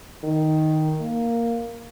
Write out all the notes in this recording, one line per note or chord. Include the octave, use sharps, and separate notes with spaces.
D#3
A#3